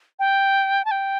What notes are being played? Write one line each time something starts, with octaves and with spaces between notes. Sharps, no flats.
G5
A5
G5